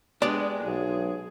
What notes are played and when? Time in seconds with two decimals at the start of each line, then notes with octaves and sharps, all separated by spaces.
0.22 G#3 B3 D4 G4 D5
0.63 B1 G#4